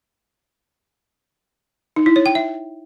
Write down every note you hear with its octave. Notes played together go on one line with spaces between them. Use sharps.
D#4
E4
C#5
G5
E5